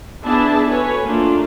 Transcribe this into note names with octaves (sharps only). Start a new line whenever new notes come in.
B3 D4 E4 G#4 E5 A5
F#4 A4 B4 C#5 G#5
A3 A#3 D4 F4